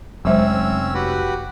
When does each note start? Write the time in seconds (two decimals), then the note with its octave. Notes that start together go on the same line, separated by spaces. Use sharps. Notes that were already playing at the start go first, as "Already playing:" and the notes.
0.25 F1 F#3 G#3 C4 C#4 C5 E6
0.94 F#4 G4 B4